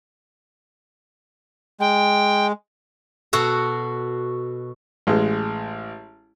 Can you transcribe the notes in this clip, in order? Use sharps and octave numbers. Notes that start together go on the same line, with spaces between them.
G#3 G5
B2 F#4 A4
A1 G#3